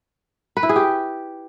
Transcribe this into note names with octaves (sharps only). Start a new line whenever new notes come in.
B4
E4
G#4
G4